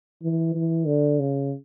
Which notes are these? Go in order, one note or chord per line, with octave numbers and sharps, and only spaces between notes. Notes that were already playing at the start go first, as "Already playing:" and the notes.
E3
E3
D3
C#3